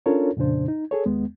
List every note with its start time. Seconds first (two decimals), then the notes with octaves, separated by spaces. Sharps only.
0.06 C#4 D4 F4 A4 A#4 C#5
0.37 F2 A#2 C#3 D4 C5
0.68 D#4
0.91 G#4 A4 C#5
1.06 D#2 G#3 B3